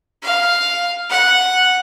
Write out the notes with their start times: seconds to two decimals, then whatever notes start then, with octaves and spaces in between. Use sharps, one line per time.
0.23 F5
1.10 F#5